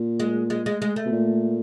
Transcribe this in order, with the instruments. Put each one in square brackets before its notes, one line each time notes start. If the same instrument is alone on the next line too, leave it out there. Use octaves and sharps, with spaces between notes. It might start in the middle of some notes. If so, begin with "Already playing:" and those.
Already playing: [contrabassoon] A#2
[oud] G#3
G#3
G#3
G#3
A3
[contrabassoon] B2
A#2